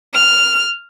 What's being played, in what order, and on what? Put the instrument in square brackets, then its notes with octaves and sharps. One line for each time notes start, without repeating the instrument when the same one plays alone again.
[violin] F6